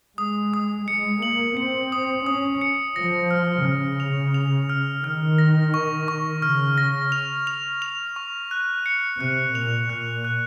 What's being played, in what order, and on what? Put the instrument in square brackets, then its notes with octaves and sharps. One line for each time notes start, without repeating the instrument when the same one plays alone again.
[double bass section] G#3 [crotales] D#6
[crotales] D#6
[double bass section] G#3 [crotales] C#7
[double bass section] A#3 [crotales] F#7
[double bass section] C4 [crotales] C#7
[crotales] D#6
[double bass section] C#4 [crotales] D#6
[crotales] C#7
[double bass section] F3 [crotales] A#6
[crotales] F6
[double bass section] C#3 [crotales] F6
[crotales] F7
F7
F6
[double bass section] D#3 [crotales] F6
[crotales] A#6
C#6
C#6
[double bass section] C#3 [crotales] F6
[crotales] A#6
F7
F7
F7
C#6
F#6
C#7
[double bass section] C3 [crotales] F#6
[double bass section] A#2 [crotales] F7
[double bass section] A#2 [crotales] F#6
[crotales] F#6